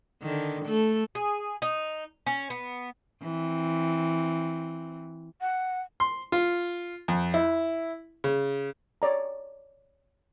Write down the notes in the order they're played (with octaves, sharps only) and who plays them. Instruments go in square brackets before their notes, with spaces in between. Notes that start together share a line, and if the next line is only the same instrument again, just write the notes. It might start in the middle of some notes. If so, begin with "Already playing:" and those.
[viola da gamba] D3 D#3
A3 A4
[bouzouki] G#4
D#4
C#4
B3
[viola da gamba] E3 C4
[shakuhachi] F#5
[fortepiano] C6
F4
F2
E4
C#3
[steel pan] C#5 D5 A#5